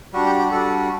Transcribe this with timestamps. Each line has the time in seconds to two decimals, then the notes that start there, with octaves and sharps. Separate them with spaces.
0.13 G3 D4 F#4
0.26 G4
0.39 G4
0.51 G3 D4 F#4 A4